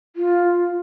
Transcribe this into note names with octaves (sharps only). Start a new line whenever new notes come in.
F4